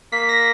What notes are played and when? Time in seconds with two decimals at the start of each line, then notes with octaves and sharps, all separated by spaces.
0.12 A#3 B6
0.29 A#6